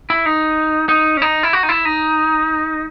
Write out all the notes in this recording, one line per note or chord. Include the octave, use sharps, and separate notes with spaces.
E4
D#4
D#4
C#4
D#4
E4
F#4
D#4
E4
D#4